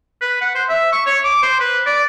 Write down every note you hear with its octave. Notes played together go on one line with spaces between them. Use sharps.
B4
F#5
C5
E5
C#6
C#5
D6
C5
B4
D5